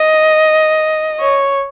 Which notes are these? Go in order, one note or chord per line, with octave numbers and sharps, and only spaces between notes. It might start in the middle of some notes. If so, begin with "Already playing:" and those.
Already playing: D#5
C#5